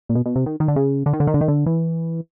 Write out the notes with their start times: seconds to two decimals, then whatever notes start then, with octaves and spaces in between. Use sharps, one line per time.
0.09 A#2
0.15 B2
0.26 B2
0.36 C3
0.46 D#3
0.60 D#3
0.68 D3
0.76 C#3
1.06 D3
1.13 D#3
1.20 D3
1.27 D#3
1.34 D3
1.41 D#3
1.48 D3
1.66 E3